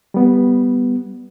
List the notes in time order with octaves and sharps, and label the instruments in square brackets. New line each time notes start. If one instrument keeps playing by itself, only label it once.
[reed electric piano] G3 B3